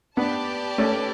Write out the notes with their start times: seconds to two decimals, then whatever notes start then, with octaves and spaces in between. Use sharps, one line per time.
0.17 B3 D4 G4 B4 D5 A5
0.78 A3 C#4